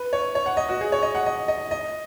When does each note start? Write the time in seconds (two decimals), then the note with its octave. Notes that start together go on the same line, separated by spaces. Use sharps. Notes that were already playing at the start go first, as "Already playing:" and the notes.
Already playing: B4
0.13 C#5
0.35 C#5
0.46 F#5
0.57 D#5
0.69 F#4
0.81 G#4
0.92 C#5
1.02 D#5
1.15 F#5
1.26 D#5
1.48 D#5
1.71 D#5